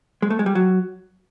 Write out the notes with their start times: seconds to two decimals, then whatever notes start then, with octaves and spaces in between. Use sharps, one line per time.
0.22 G#3
0.30 A3
0.39 G#3
0.46 G3
0.55 F#3